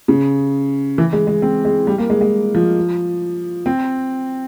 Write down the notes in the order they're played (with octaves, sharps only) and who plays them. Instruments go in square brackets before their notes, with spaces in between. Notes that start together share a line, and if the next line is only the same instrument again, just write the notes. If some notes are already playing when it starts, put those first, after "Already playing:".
[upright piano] C#3
E3
G#3
G#3
C4
G#3
G3
A#3
G#3
G#3
F3
C4